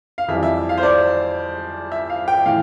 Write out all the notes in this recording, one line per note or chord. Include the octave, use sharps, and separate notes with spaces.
F5
F2 E3 G3 E5
E5
F5
C5
D5
E5
F5
G5
A2 E3 F5